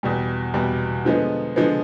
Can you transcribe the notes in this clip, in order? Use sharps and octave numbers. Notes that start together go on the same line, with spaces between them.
E2 B2 G3
E2 B2 G3
D3 F3 G#3 B3
D3 F3 G#3 B3